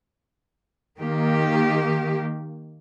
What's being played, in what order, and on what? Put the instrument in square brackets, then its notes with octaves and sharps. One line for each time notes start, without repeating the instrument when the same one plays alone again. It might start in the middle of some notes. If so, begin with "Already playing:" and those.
[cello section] D#3 A#3 G4